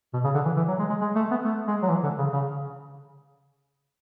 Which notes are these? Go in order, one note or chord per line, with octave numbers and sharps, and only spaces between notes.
B2
C#3
D3
E3
E3
F#3
G#3
G#3
G#3
A3
B3
A3
G#3
F#3
E3
D3
C#3
C#3